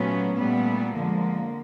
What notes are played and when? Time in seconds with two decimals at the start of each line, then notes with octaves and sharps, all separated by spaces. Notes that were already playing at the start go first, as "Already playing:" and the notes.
Already playing: A#2 F#3 A3 B3 C#4
0.37 A#2 G3 A3 B3
0.95 F2 D3 F3 G#3 A#3